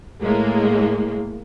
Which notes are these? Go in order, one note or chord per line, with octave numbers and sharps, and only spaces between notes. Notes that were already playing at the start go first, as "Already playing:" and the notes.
A2 G#3 A#3